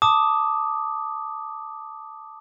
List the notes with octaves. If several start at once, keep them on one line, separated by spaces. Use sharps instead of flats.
A5 D6 D#6